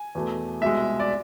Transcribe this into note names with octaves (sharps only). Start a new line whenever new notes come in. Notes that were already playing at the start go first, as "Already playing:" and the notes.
Already playing: G#5
E2 B2 A3
C2 B2 G#3 E5
D5